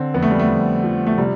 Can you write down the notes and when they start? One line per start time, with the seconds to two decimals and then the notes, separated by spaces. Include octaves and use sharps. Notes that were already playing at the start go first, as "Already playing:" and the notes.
Already playing: D3 C4
0.14 F2 B3
0.23 A3
0.31 G3
0.39 A3
0.49 F2
0.83 F3
1.07 A3
1.18 C3 G3